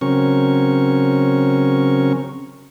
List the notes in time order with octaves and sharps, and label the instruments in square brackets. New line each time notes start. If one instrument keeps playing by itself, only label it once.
[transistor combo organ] C#3 F#3 C4 C#4 A#4 C#6